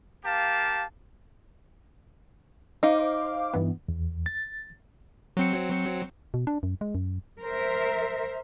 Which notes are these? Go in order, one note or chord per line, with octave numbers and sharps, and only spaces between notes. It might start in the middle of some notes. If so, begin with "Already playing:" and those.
A#3 G4 F5 A5
D#4 C5 F5 D6
G2 E3 B3
E2
A6
F#3 C4 C#7
B2
D4
F#2
G#3
F#2
A#4 C5 E5